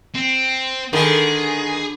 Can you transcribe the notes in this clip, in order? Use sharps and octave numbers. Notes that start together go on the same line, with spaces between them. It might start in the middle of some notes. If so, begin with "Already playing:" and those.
C4
D3 D#3 G#3 G#4 B5